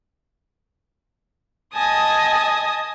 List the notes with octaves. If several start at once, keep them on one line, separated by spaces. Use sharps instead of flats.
D#5 G#5 A5 D#6